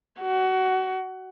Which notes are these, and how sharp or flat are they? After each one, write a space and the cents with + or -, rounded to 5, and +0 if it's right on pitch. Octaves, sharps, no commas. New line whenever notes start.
F#4 +20